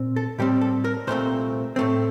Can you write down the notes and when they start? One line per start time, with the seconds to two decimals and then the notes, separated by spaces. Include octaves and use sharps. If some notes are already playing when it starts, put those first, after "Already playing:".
Already playing: A#2 C4
0.16 A4
0.39 A2 G3 C4 G4
0.61 A4
0.85 A#4
1.07 C2 A#2 A3 C4 C5
1.76 A2 A3 C4